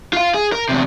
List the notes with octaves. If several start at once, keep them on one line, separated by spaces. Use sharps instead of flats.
F4 F5
G#4
A#4
E2 C3